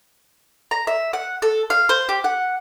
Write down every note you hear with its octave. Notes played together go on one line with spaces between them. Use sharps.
A#5
E5
F#5
A4
F5
C5
G4
F#5